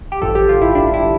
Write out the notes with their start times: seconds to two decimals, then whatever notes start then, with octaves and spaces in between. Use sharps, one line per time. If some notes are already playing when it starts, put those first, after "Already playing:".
0.12 G4
0.22 A1 G2 D3 F3 A4
0.35 G4
0.49 F4
0.62 E4
0.75 D4
0.94 E4